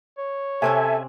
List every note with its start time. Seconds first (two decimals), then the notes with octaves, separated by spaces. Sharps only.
0.18 C#5
0.62 C3 C4 C#4 A4 E5 G#5